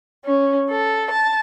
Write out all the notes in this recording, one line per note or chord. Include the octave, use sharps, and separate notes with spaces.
C#4
A4
A5